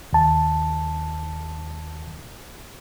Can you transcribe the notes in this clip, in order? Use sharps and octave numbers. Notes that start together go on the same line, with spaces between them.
D#2 A5